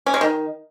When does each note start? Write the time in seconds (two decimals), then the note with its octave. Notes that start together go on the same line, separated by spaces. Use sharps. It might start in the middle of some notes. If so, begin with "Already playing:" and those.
0.06 C#4
0.14 G#3
0.21 D#3